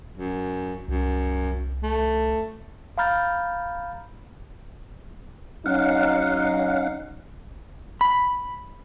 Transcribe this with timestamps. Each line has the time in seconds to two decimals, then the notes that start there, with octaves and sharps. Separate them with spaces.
0.17 F#2
0.88 C2 F#2
1.83 A3
2.98 F5 A#5 B5 F6 G6 A6
5.66 F#3 C#4 D#4 F5 F#5
8.01 B5